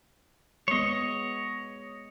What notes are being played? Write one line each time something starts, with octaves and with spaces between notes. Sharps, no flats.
G#3 B3 C#5 D#5